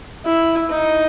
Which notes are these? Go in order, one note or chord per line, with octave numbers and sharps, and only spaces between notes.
E4
D#4